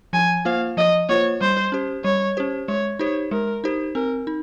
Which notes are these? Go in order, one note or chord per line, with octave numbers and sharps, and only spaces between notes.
F3 G#5
A#3 F4 C5 F5
F3 D#5
A#3 F4 C5 C#5
G3 C5
C#4 G4 C5
G3 C#5
C#4 G4 C5
G#3 C#5
D#4 G4 C5 C#5
G#3 A#4
D#4 G4 C5
C4 A#4
D#4